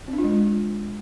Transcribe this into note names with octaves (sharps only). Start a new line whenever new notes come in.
C4
D4
F4
G#3